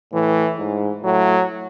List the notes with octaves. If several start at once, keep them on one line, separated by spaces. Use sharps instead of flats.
A2 E3
G#2
A2 F#3